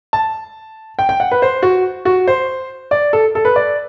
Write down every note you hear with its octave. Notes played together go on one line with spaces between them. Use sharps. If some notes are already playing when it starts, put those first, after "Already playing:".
A5
G5
G5
F#5
B4
C5
F#4
F#4
C5
D5
A4
A4
B4
D5